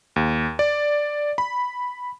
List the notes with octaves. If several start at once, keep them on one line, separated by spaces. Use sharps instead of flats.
D#2
D5
B5